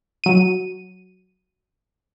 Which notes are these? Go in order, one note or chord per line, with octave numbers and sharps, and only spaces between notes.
F#3 D#7